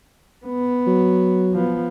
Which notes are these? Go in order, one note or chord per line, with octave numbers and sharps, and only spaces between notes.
B3
F#3
F3 B3